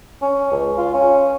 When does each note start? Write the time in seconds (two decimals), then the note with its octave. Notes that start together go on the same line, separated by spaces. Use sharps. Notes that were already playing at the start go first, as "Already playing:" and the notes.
0.22 C#4
0.52 C#2
0.78 F4
0.94 C#4